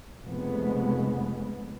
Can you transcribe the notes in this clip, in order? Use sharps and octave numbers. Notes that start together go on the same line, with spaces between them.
F1 F2 C#3 G#3 B3